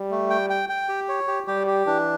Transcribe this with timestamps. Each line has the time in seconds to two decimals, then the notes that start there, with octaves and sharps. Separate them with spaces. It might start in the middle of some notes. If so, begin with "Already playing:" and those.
Already playing: G3
0.11 A3
0.30 G5
0.50 G5
0.69 G5
0.89 G4
1.09 C#5
1.28 G4
1.47 G3 G4
1.67 G4
1.86 E3 D4